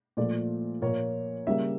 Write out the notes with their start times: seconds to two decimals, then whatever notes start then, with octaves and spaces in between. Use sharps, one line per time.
0.17 A#2 F3 A3 D5
0.82 A#2 F3 A#3 C#5
1.47 C#3 G3 A#3 E5